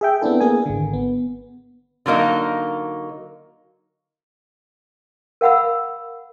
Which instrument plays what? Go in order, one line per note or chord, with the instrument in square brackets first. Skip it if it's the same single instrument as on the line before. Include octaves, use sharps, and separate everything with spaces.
[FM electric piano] G#4 E5 G5
B3 C4 D4 E4 A4
A#3 B3 G#4 A#4 G#5
G#1 D3
B3
[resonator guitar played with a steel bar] D3 F#3 A#3 D#4
[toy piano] A#4 F5 F#5 B5 E6